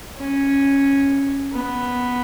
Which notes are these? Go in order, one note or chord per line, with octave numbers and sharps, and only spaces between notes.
C#4
B3